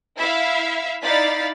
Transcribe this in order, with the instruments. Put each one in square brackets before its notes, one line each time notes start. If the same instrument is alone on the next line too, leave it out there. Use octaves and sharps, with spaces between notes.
[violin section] E4 E5 F5
D#4 E4 D5 F5 A6 B6